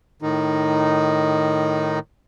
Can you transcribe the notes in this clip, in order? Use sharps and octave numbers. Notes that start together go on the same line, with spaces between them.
A2 D#3 D#4